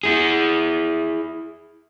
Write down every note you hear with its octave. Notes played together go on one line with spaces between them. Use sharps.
E4 G#4